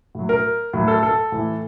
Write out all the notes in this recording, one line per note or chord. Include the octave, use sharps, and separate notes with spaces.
A2 F#3
A#4
A2 F#3
A4
A4
A2 E3